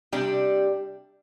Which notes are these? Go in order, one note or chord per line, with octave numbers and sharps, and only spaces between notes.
C3 G3 D4 G4